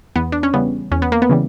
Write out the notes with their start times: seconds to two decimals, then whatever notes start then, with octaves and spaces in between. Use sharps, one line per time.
0.16 E2 B3
0.32 D4
0.43 C#4
0.54 C#3 E3 G3 B3
0.92 E2 C#4
1.02 B3
1.12 A#3
1.22 B3
1.29 C#3 E3 G3